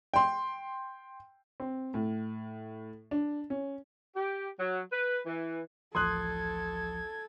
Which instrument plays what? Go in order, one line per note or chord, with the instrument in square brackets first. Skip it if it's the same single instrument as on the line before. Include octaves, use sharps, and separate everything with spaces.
[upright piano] G5 C6
[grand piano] C4
A2
D4
C#4
[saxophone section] G4
F#3
B4
E3
[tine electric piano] A1 D2 F3 [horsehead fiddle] A4 [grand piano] C6 D#6 F#6 [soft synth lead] G#6